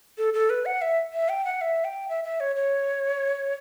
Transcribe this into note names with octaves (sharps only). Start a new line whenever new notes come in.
A4
A4
B4
F#5
E5
E5
G5
F#5
E5
G5
E5
E5
C#5
C#5